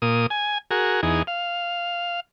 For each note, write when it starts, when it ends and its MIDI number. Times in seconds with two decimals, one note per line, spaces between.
0.02 0.27 46
0.02 0.27 87
0.30 0.58 80
0.71 1.01 66
0.71 1.01 68
0.71 1.01 70
1.03 1.22 40
1.03 1.22 63
1.03 1.22 68
1.27 2.20 77